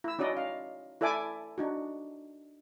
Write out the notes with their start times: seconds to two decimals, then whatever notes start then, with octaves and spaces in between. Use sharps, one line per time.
0.04 E4 E6
0.19 C#4 D#4 F#4 D5 D#5
0.37 F5
1.01 E4 A4 D5 E5 G#5 D6
1.58 D4 D#4 F#4